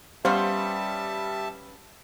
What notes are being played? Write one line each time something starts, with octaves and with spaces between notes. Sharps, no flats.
G3 B3 C#4 C5 E5 F5 A5